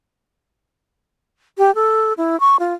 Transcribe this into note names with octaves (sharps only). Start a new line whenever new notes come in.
G4
A4
E4
C#6
F4